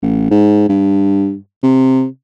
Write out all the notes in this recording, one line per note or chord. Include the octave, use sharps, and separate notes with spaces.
A1
G#2
G2
C3